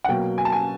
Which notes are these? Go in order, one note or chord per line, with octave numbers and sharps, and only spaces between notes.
F#5
B2 F#3 A#3 G5
G#5
A5
G#5